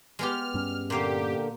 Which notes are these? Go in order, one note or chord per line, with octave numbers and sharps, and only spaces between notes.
G#3 B3 G4 F6
G2 G3 C#4
A#2 D3 A#3 G4 F5